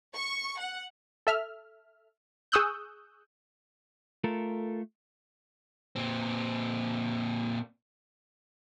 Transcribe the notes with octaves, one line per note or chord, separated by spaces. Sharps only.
C#6
F#5
A4 E5 F6
G#4 C#6 D#6 E6 F#6 G6
A3 F4 A4 A#4
A#2 C4